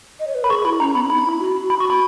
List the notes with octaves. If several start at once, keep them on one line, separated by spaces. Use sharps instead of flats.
D#5
C#5
B4
A#4 B5
G#4 C#6
E4 B5
C#4 A#5
B3 B5
C#4
D#4 B5
E4
F#4
F#4
F#4 B5
C#6
B5